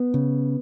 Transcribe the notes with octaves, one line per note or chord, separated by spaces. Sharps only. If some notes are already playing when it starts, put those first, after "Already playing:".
Already playing: B3
C#3